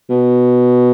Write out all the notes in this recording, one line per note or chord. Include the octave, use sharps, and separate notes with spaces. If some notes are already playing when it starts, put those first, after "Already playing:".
B2